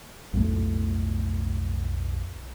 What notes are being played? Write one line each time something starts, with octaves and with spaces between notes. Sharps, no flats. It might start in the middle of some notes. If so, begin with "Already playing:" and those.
B1 F2 A2 A3